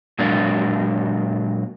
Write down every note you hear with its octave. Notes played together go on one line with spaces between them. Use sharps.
A#2 F#3 G#3 D4 A#4 D5